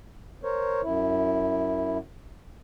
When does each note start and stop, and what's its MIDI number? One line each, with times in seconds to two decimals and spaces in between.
0.43 0.81 70
0.43 0.81 72
0.43 0.81 73
0.83 1.98 42
0.83 1.98 64